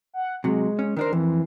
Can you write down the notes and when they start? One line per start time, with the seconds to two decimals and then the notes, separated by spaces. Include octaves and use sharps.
0.13 F#5
0.44 C3 F#3 G#3
0.79 C#4
0.97 D#3 D4 A#4 C5
1.13 F2 E3